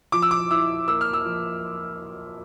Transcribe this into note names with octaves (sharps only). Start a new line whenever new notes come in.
F3 D6
E6
D6
E4 E6
A#3 E6
F6
E6
F3